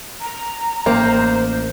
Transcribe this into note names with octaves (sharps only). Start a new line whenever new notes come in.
A#5
A1 A#3 C5